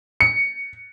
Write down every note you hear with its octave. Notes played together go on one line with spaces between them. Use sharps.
C#7